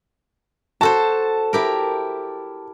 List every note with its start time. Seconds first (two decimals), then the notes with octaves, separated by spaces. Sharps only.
0.81 F#4 A4 C5 A5
1.53 E4 G4 A#4